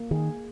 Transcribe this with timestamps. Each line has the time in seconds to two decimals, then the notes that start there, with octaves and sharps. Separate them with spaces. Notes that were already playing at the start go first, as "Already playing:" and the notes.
Already playing: A#3
0.11 D#3 G#4